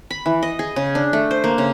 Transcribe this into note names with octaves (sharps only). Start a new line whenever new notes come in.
B5
E3
D#5
G#4
C#3
D4
A3
C5
A#3
C#3